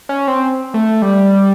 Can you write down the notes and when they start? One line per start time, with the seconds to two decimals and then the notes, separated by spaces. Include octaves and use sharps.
0.09 C#4
0.28 C4
0.74 A3
1.02 G3